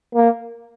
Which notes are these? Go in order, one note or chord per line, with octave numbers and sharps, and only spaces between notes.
A#3